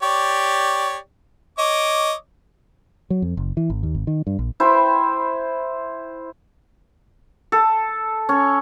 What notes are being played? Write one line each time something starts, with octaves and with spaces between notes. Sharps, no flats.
G4 C#5 D5
C#5 D#5 D6
F#3
F2
F#1
E3
G#1
D#2
G#1
D#3
G2
A#1
E4 C5 G5 B5
A4
C#4